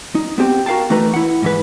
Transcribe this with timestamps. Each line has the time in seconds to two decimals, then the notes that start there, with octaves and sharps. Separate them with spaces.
0.15 D#4
0.38 B3 C4 G4 G5
0.66 F#4 A#4 F5 G5 A5
0.90 E3 A3 D#4 B4 A#5
1.14 E4 F#5
1.42 G#2 E3 B4